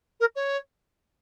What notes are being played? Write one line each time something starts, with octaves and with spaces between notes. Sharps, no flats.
A#4
C#5